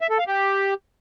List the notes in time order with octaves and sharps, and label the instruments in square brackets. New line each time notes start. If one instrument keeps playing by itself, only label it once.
[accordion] E5
A4
F5
G4